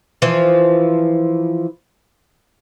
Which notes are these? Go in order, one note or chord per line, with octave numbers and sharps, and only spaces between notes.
E3 F3